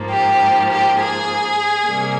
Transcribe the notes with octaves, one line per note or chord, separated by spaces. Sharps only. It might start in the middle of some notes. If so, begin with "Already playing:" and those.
Already playing: G#2 F3 A#3
G4
G4
G#4
C3 G3 A#3